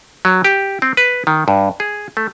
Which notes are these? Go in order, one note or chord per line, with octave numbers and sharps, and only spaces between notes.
F#3
G4
C4
B4
D#3
G2
G#4
A3